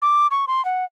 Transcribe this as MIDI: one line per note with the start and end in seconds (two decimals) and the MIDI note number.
0.02 0.27 86
0.31 0.45 85
0.47 0.64 84
0.65 0.84 78